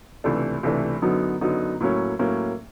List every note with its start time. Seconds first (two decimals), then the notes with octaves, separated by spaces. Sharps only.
0.24 C#2 C3 E3 A3 D4
0.63 C#2 C3 E3 A3 D4
1.02 F#2 D3 F#3 B3 D#4
1.41 F#2 D3 F#3 B3 D#4
1.80 A2 F#3 A#3 C#4
2.19 A2 F#3 A#3 C#4